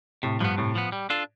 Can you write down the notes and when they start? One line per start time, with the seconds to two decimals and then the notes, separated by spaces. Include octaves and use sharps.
0.23 A2 C3
0.40 G2 F3 B3
0.58 A2 C3
0.75 F3 B3
0.92 G3
1.10 D4 F4 A4